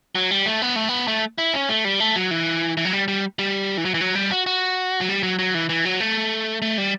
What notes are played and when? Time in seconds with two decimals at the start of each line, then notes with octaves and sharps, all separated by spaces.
0.15 F#3
0.31 G3
0.46 A3
0.62 B3
0.76 A3
0.89 B3
1.07 A3
1.38 E4
1.54 C#4
1.69 A3
1.85 G3
2.00 A3
2.16 F#3
2.31 E3
2.77 E3
2.85 F#3
2.93 G3
3.08 G3
3.39 G3
3.78 E3
3.85 F#3
3.94 E3
4.01 F#3
4.15 G3
4.31 F#4
4.46 F#4
5.01 F#3
5.09 G3
5.23 F#3
5.39 F#3
5.54 E3
5.69 E3
5.85 F#3
6.00 A3
6.62 A3
6.78 G3